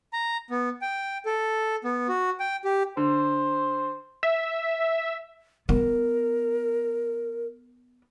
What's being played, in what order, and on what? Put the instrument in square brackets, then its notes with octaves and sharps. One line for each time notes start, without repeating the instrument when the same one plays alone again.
[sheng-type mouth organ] A#5
B3
G5
A4
B3
F#4
G5
G4
[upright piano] D3 [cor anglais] C5
[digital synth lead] E5
[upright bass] B3 [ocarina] A#4